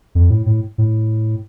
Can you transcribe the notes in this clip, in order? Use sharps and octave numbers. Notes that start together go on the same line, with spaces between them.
F2
A2
A2
A2